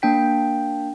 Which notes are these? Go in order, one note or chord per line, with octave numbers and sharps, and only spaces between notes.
A#3 D4 G5 B6